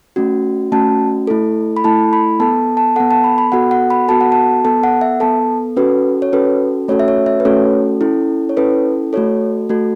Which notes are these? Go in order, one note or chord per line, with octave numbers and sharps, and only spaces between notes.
A3 C#4 F#4
A3 C#4 F#4 A5
A3 E4 A4
B5
A3 E4 A4 A5
B5
B3 A4 A5
A5
B3 A4 F#5
A5
B5
B5
B3 F#4 A4 F#5
F#5
B5
B3 F#4 A4 A5
F#5
A5
B3 A4 A5
F#5
E5
B3 A4 A5
C#4 F#4 A4 B4
C#5
C#4 F#4 A4 B4
A3 C#4 F#4 A4 C#5
E5
C#5
E5
B4
A3 C#4 F#4 A4 C#5
C#4 E4 A4
C#5
C#4 E4 A4 B4
A3 F#4 A4 C#5
A3 F#4 A4